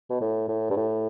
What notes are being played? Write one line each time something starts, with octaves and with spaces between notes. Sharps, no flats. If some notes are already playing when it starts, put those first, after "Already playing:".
B2
A2
A2
G2
A2